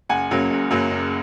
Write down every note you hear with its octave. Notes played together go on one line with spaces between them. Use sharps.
F#1 F#5 G#5
F#2 C#3 F#3 A#3
F#1
F#2 C#3 F#3 A#3
F#1